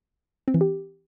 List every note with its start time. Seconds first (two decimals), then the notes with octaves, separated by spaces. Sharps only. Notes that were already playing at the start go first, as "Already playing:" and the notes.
0.48 C4
0.54 E3
0.61 G4